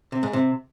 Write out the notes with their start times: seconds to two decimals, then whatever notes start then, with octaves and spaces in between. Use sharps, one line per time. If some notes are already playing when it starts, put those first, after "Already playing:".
0.12 C3
0.23 G#2
0.33 C3